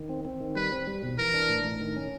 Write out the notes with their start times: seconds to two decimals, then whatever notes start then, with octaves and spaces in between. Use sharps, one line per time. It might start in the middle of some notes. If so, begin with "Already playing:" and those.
Already playing: D#3
0.09 C4
0.25 C4
0.40 D#3
0.56 G3 B4
0.72 C4
0.87 G3
1.03 B2
1.18 E3 A#4
1.34 D4
1.49 A2
1.65 A2
1.81 D#3
1.96 C#4